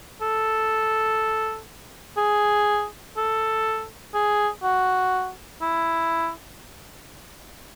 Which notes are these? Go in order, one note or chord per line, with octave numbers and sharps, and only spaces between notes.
A4
G#4
A4
G#4
F#4
E4